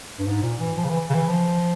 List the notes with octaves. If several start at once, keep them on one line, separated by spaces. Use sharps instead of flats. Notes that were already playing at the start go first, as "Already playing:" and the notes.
G2
G#2
A#2
E3
F3
C#3
E3
C#3
E3
F3